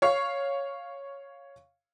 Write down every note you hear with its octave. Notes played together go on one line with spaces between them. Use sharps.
C#5 F5 C#6 C7